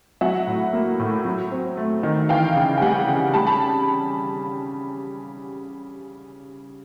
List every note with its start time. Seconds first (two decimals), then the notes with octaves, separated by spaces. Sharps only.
0.21 F#3 E5 F#5
0.47 A2
0.73 A#3
0.99 A2
1.25 F#3
1.51 C4
1.77 A3
2.03 D#3
2.29 E3 F5 G5
2.56 C#3
2.78 G5
2.81 G3 F#5 G#5
3.08 C#3
3.34 G3 A5 B5
3.47 A5 B5